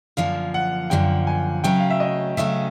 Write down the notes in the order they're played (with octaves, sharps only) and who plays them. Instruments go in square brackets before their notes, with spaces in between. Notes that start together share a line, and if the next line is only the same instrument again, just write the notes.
[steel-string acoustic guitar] F#2 D3 F3 A#3 [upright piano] F5
[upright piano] F#5
[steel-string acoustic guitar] F#2 D3 F3 A#3 [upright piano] G5
[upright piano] G#5
[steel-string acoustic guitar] C#3 F#3 A3 C#4 [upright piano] G5
[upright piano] F5
E5
D#5
[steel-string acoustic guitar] C#3 F#3 A3 C#4 [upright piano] E5